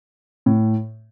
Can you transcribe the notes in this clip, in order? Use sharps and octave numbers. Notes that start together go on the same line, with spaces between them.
A2